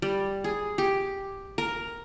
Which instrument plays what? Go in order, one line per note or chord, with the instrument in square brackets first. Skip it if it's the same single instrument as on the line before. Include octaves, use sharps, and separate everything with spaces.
[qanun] G3
G#4
G4
A#4